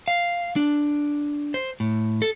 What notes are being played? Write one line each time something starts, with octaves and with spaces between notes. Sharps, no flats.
F5
D4
C5
A2
A4